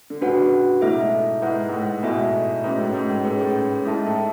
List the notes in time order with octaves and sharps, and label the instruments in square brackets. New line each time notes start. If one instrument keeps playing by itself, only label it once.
[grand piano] D3
[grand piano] A2 C#3 [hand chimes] D4 F#4 B4 F#5
[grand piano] G#2 B2 [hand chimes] A3 E4 A4 E5
[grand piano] G#2 [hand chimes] E4 B4 F#5
[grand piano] G#2
A2
[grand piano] G#2 B2 [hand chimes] A3 E4 A4 E5 G#5
[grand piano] G#2 [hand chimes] A3 C#4 F#4 B4
[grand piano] A2
G#2
A2
[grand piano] A2 [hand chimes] C#4 G#4 B4
[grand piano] A2
A2
[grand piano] G#2 [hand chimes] A3 E4 A4 E5 A5
[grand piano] A2